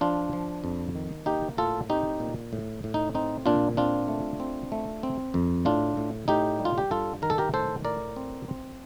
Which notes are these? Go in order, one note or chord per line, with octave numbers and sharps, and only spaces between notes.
F3 D4 F4
F3
F2
D#3
A#3 D#4 G4
A2 F4 A4
C4 D#4 G4
A#2
A2
A2
D#4
C4 D#4
A#2 D4 F4
C4 D4 F4
A3
C4
A3
C4
F2
A2 D4 F4
A2
A2 D#4 G4
G3
F4
G4
G2 F4 A4
D#3 A#4
A4
G4 A#4
A2 A4 C5
A2 A#4 D5
C4
C4